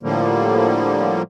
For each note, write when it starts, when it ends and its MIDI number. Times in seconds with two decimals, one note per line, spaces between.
0.03 1.22 45
0.03 1.22 50
0.03 1.22 53
0.03 1.22 55
0.03 1.22 58